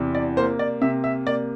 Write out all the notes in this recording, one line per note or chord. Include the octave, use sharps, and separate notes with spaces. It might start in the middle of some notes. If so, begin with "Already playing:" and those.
Already playing: E2 C3
D5
A#3 C5
D5
C3 E5
E5
A#3 D5